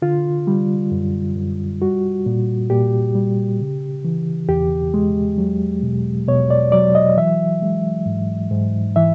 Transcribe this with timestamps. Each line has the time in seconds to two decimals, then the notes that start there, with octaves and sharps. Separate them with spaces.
0.02 D3 F4
0.47 G3
0.92 F#2
1.36 F#2
1.82 G3 F#4
2.26 A#2
2.70 A#2 G4
3.15 G3
3.60 C#3
4.05 E3
4.49 E2 G4
4.94 G#3
5.38 F#3
5.83 B2
6.28 B2 C#5
6.50 D5
6.72 F#3 D5
6.95 D#5
7.17 E3 E5
7.62 G#3
8.06 G#2
8.51 G#2
8.96 E3 E5